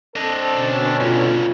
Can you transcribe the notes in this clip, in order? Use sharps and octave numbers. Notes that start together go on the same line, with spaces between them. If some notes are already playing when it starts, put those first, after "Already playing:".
C4 D4 A4 D#5
B2 D3 C#4
G2 C3 F4